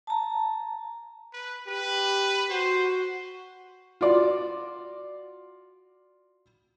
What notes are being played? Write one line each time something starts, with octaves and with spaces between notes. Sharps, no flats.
A5 A#5
B4
G4 B4
F#4 C5
F4 F#4 D5